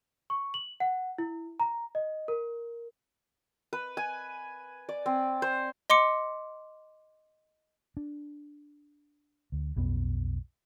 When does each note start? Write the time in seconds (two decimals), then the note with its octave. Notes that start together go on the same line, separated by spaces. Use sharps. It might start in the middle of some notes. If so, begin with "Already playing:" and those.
0.30 C#6
0.54 F#7
0.80 F#5
1.18 E4
1.60 A#5
1.95 D#5
2.28 A#4
3.73 B4
3.97 G#5
4.89 D5
5.06 C4
5.42 C5
5.90 D#5 C6 D6 C#7
7.97 D4
9.52 D2
9.76 B1 F2 B3